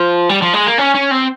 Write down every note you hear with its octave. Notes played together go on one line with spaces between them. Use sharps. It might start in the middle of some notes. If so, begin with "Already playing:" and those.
Already playing: F3
G3
F3
G#3
A#3
C#4
C#4
C4